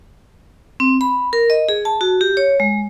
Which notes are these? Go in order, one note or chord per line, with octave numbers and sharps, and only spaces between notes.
C4
B5
A#4
D#5
G#4
A5
F#4
G4
C#5
G#3